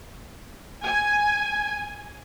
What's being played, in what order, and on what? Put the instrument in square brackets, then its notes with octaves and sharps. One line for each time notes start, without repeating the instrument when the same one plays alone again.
[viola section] G#5